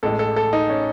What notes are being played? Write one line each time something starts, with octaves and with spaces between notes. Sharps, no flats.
A1 A2 G#3 A4
A4
A4
D#4
C#4